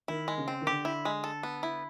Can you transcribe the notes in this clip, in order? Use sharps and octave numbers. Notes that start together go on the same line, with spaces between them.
D#3 E4
G#3
C#3
C4
D#3
D3 G4
E4
G#3
A4
B3
E4